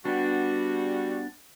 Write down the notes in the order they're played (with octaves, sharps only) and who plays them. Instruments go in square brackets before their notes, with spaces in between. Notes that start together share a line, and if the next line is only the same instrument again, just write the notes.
[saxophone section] G3 F#4 [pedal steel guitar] B3 D4